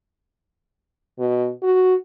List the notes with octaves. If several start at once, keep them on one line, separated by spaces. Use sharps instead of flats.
B2
F#4